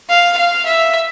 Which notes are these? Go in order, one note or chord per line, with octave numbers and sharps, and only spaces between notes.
F5
F5
E5